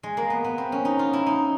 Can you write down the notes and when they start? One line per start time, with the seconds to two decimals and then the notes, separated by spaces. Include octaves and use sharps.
0.03 G#3
0.17 A#3
0.30 B3
0.44 B3
0.58 C4
0.72 C#4
0.85 D#4
0.99 F4
1.13 E4
1.26 D#4